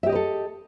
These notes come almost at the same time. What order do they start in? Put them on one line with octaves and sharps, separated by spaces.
E5 G4 D#5 B4 A4